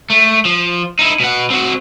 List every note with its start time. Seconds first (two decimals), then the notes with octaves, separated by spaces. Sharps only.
0.10 A3
0.45 F3
0.99 D#4 E4
1.20 B2 F#5
1.50 C4 F#4